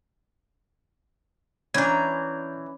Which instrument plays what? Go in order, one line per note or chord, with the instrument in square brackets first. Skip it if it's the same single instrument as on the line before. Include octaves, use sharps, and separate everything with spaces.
[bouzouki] E3 A#5 [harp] C#4 D4 [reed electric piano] G6 G#6